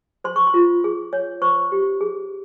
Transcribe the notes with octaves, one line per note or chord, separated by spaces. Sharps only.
C5 C6
C#6
C6
F4
G#4
C#5
C5 C#6
G4
G#4